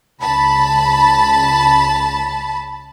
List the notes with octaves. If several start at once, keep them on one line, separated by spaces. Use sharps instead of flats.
C#2 A5 B5